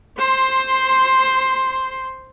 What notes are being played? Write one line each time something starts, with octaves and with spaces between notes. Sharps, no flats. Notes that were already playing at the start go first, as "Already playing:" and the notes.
C5 C6